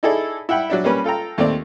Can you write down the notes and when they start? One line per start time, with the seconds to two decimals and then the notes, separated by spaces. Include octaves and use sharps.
0.03 D#4 E4 G#4 A4 D5
0.49 E4 F#5 G5 B5
0.70 F#3 D4 E5
0.84 G3 A#3 C#4 B4
1.04 F4 A4 G5 A#5
1.38 D#2 A3 C4 D5